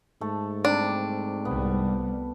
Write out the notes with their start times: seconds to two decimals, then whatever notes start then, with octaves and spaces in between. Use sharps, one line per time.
0.21 G#2 A3 A4
0.65 C3 G3 D4
1.45 C2 G3 B3